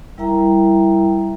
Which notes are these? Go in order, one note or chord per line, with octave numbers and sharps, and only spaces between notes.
G3 E4 A#4 E5 G5 A#5